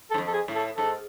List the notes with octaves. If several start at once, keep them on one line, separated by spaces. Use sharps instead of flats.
A4
G#2
F2
A4
G#4
A2
A4
G#2 A4